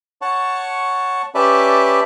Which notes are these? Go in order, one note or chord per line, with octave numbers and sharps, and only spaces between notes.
C#5 F#5 A5 C#6
C#4 G4 B4 D5 E5 A5